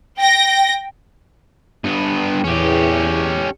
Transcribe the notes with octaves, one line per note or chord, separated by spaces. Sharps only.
G5 A#6
G2 B3
E2 C#4 G4